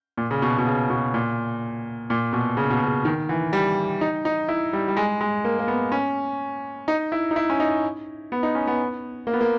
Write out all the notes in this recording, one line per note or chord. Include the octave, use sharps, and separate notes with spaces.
A#2
C#3
B2
B2
C#3
B2
A#2
A#2
B2
C#3
B2
C#3
D#3
E3
G3
D#4
D#4
E4
G3
G3
G#3
G#3
A#3
A#3
B3
C#4
D#4
E4
D#4
E4
C#4
D#4
B3
D#4
C#4
B3
A#3
B3
A#3